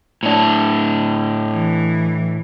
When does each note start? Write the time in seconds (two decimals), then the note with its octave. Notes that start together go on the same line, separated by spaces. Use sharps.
0.23 A2 D4
1.52 E3